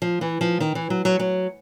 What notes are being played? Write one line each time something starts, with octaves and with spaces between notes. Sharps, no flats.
F3
E3
F3
D#3
E3
F#3
F#3
F#3